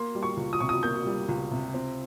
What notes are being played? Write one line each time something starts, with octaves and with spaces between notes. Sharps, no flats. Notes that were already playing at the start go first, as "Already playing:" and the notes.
Already playing: A#3 C6
G3
C#6
C#2
D#6
C3 C#6
D#6
A#3 G6
G3
C#2
C3
C4